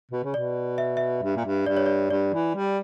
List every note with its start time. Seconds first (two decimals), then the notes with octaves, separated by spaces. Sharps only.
0.11 B2
0.23 C#3
0.34 B2 D5
0.78 E5
0.97 E5
1.23 G2
1.36 A#2
1.45 G2
1.66 G2 D5
1.77 C#5
1.86 D5
2.10 G2 D5
2.33 E3
2.55 G3